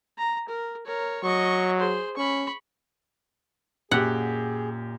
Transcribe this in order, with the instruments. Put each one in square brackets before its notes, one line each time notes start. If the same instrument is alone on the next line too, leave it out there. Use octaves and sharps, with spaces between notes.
[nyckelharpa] A#5
A#4
A#4 C#5
[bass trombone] F#3 [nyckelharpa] D#5 C#6
[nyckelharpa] G#4 C5
[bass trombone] C#4 [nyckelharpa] B5 C#6
[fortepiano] F#2 G4 [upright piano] A#2 [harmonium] G#4 [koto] F#5